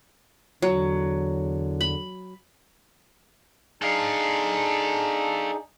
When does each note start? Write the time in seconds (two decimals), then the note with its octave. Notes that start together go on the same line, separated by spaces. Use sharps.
0.62 E2 D3 F#3
1.81 B5
3.82 D4 D#4 G#4 A4 F5